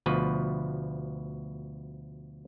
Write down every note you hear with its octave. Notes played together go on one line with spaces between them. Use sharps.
D2 B2 F3 B4